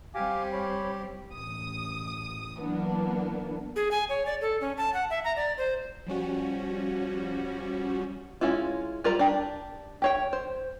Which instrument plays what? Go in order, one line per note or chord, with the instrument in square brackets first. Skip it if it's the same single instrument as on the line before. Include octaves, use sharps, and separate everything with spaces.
[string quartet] G3 C4 [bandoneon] G4 [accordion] F5 G#5 D6
[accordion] C#5 B5
[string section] A1 D#6
E3 F#3 A#3 B3 D4
[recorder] G#4
G#5
C#5
D5
A4
C#4
A5
F#5
E5
A#5
D5
C5
[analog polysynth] F3 G3 C#4 F#4
[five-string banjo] G#3 C#4 E4 F4
G3 F4 A#4 C5 A#5
D4 G4
G4 C#5 G5
C5